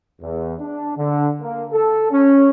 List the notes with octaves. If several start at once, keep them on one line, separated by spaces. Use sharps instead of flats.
E2
D4
D3
A#3
A4
C#4